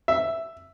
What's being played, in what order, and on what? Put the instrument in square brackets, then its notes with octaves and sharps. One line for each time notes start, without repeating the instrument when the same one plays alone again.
[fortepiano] E5